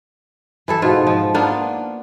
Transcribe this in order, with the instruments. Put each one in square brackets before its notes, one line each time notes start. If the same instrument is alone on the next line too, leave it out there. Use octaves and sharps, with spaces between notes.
[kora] E3 E4 A4
G#2 B2 F4
F3
A#3 B3 D4 F4